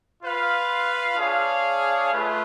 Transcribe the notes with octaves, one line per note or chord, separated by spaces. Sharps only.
F4 B4 F5
D4 G#4 C#5 F5
A3 F4 B4